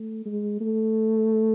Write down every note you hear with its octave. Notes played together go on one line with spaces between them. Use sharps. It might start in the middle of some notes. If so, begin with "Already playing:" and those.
Already playing: A3
G#3
A3